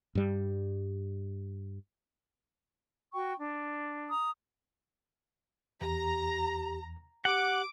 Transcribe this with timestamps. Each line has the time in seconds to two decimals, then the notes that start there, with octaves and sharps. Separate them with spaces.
0.15 G2 G3
3.13 F#4 G5 C#6
3.38 D4
4.09 A#5 D#6
5.81 E2 G4 A#5
7.25 G4 F#5 D6